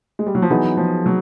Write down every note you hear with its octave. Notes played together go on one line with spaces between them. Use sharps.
G#3
G3
F#3
F3
E3 F#3 B3 D#4 G#4
F3
F#3